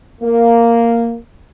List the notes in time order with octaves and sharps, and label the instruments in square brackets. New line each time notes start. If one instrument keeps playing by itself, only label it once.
[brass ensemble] A#3